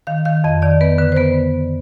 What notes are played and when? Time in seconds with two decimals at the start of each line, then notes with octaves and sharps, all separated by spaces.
0.07 D#3 F5
0.25 D#3 F5
0.44 F2 D#5
0.62 D#3 D5
0.81 B3 B4
0.98 D3 B4
1.12 C5
1.16 B3 B4